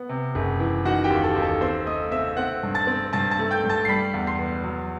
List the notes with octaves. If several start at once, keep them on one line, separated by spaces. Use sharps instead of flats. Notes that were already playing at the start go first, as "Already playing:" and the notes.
Already playing: B3
C3
F#1
E3
D#3 F#4 F#5
G4 G5
D#2
A4 A5
D#2
A4 A5
C4 C5 C6
A3 D#5 D#6
C4 E5 E6
C4 F#5 F#6
G2
A5 A6
C4
G2 A5 A6
A5 A6
A3
G5 G6
G2
A5 A6
C7
G3 B5 B6
E2
C6 C7
B3
F#3